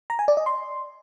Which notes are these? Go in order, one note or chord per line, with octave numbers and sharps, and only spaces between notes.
A#5
G#5
D5
D#5
C6